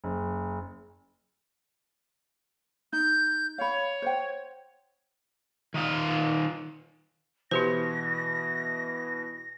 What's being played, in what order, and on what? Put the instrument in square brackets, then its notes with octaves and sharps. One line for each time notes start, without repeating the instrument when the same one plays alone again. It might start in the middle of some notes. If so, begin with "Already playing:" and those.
[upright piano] F#1
[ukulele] D#4 [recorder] G6
[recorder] C#5 [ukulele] F5 B5
[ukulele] C5 F#5 G5
[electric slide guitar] D#3 D#4 F4
[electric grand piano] B2 E3 [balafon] E4 G4 C5 [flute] A#6